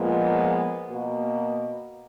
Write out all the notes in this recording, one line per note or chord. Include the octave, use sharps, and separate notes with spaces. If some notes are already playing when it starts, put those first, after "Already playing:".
Already playing: A#2 F3 G#3 B3
B2 A#3 F#4